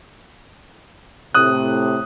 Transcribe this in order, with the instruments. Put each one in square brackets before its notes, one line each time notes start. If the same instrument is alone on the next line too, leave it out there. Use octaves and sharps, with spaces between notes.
[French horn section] A2 C3 [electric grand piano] D#6 F#6